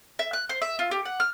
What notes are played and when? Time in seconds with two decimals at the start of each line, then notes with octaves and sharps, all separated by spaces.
0.19 E5
0.33 F#6
0.49 C5
0.62 E5
0.79 F4
0.91 G4
1.05 F#5
1.20 F6